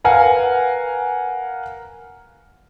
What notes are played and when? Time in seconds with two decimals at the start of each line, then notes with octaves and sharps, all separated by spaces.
0.05 A#4 B4 F5 F#5 G#5